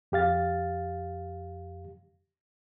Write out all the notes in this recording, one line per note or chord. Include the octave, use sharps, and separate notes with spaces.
F2 G4 F5 A6